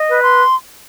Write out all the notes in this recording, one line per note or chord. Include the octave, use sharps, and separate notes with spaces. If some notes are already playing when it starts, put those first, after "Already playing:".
Already playing: D#5
B4
C6